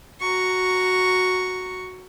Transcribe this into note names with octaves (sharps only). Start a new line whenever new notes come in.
F#4 A#5 C#6